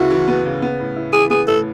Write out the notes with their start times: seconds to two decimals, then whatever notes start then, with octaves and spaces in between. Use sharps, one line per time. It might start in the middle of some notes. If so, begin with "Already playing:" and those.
Already playing: D2 C#3 B3 E4 F#4
0.11 E3
0.28 B3
0.45 C#3
0.62 B3
0.80 A2
0.96 E4
1.13 E3 G#4
1.30 B3 G#4
1.48 A2 A4